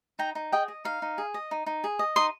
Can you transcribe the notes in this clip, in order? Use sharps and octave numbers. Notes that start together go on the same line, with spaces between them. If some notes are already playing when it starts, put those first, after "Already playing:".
D#4 G5 A#5
D#4
G#4 D#5 G5
D#5
D#4 F5
D#4
G#4
D#5
D#4
D#4
G#4
D#5
D#4 C6 D#6